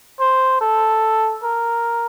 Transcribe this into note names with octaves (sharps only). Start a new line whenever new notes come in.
C5
A4
A#4